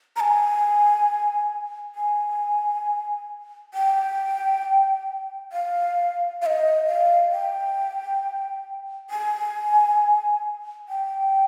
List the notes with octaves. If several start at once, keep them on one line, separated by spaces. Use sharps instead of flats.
A#5
G#5
G#5
G5
F5
F5
D#5
F5
G5
G#5
G5